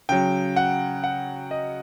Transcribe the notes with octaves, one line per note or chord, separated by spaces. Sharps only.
C#3 F#3 G5
F#5
F#5
D#5